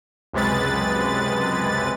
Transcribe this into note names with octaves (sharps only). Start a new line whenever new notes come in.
C#2 F#2 C3 G#3 B4 A6